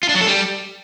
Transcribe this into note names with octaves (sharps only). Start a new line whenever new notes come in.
F4
D4
F#3
A4
G3